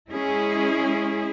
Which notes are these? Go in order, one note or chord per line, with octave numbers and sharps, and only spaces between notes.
G#3 C#4 E4 G#4